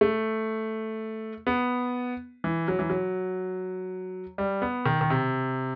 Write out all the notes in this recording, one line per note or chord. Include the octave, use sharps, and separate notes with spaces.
A3
B3
E3
F#3
E3
F#3
G3
B3
D#3
D#3
C3